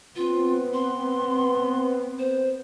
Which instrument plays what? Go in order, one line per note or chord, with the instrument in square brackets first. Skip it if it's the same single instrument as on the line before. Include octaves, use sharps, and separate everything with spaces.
[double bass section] B3 C4 [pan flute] F4
[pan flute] C6
C5